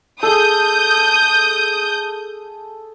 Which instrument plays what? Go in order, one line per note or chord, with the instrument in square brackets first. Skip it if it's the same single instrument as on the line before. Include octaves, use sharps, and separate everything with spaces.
[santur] G#4 A4 [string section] D#6 G6